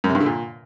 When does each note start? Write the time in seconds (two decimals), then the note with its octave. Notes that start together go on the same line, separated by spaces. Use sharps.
0.04 F#2
0.09 C3
0.15 G2
0.20 D3
0.26 A#2